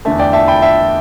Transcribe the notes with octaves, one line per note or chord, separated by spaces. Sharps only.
E2 D3 A3 E5 A5
D5 G5
E5 A5
G5 B5
E5 A5